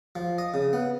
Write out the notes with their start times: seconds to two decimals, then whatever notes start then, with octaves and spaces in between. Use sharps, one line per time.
0.15 F3
0.38 D#5
0.54 C#3
0.73 B3